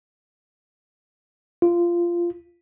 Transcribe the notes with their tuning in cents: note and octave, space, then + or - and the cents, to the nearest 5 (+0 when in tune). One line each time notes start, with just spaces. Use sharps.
F4 -15